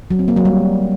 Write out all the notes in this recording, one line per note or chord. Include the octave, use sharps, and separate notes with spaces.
F#3
C4
A#3
F#3
G3